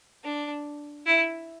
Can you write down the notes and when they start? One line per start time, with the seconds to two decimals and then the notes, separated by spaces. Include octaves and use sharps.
0.24 D4
1.06 E4